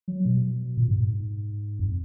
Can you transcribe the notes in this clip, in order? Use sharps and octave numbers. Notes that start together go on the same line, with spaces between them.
F#3
B2
A#2
G#2
G#2
F2